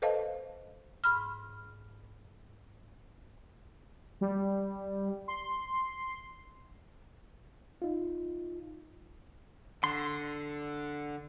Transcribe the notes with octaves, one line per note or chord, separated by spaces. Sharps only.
A4 B4 C5 D#5 F5 A5
G#2 B5 F6
G3
C6
D#4 F4
D3 C6